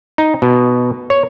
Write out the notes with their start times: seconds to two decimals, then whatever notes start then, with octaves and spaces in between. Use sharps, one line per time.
0.18 D#4
0.42 B2
1.10 C#5